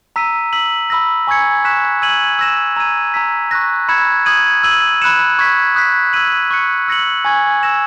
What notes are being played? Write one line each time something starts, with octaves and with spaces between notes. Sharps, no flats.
A#5 E6 B6 D#7
E6 B6 F#7
B5 E6 A#6
G#5 C#6 E6 G#6 C#7
C#6 F#6 B6 E7
E6 G#6 D#7 F#7
E6 A#6 E7
A#5 E6 G#6 D#7
A#5 E6 B6
C#6 F#6 A#6
B5 E6 G#6 C#7 E7
D#6 G#6 D#7 F#7
E6 G#6 D#7 F#7
B5 F#6 C#7 E7
C#6 G#6 B6
D#6 F#6 B6
E6 G#6 D#7 F#7
C#6 F#6 C#7
E6 A#6 C#7 F#7
G#5 C#6 G#6
E6 A#6 E7